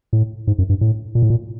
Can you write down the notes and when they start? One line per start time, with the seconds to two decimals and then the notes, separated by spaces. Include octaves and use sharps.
0.13 A2
0.47 G#2
0.58 F#2
0.69 G2
0.81 A2
1.15 A#2
1.23 A2
1.30 A#2